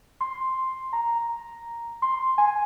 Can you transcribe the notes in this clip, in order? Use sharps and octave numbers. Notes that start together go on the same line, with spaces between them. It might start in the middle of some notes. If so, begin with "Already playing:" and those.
C6
A#5
C6
G#5